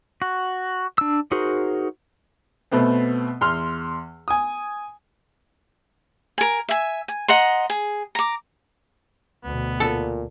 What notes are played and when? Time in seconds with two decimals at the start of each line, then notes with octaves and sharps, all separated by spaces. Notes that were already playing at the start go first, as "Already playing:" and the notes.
0.22 F#4
0.98 D4 E6
1.31 D#4 F#4 G#4 A#4 C5
2.71 B2 A3 B3 C4
3.41 E2 C6 F6
4.28 G#5 D#6
6.38 A#4 G#5
6.69 E5 G#5
7.08 G#5
7.28 D#5 F#5 A#5 C6
7.70 G#4
8.15 A#5 D6
9.44 D2 B2 B3
9.80 A#2 A4